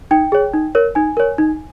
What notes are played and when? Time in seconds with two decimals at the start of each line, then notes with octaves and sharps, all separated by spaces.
0.11 D#4 G5
0.32 G#4 C#5
0.54 D#4
0.75 A#4 C#5
0.95 D#4 G#5
1.17 A#4 C#5
1.38 D#4